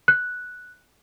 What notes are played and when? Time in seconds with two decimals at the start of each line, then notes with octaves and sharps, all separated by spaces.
0.08 F#6